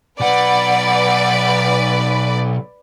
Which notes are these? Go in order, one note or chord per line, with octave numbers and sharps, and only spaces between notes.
B1 B4 D5 F#5